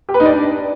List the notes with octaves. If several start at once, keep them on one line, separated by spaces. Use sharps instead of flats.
G4
B4
D#4
D5
D4